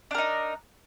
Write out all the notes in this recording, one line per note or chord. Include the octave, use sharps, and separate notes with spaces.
D4 D#4 A#4